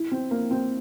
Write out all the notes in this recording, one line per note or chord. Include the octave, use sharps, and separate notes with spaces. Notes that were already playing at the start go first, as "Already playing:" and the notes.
Already playing: E4
C4
A#3
C4